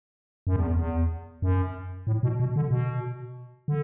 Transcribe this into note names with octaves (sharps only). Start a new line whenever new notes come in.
F#2
E2
E2
F#2
A2
B2
B2
D3
B2
D3